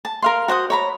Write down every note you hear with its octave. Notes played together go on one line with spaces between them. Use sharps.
A5
A#4 F5 C6
F#4 C5 F#5 D#6
C#5 A#5 B5